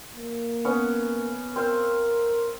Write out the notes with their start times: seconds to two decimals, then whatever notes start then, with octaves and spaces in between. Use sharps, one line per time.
0.16 A#3
0.65 B3 C#4 F#5
1.56 C4 A#4 C5 F5